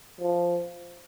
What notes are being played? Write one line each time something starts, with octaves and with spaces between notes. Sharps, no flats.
F3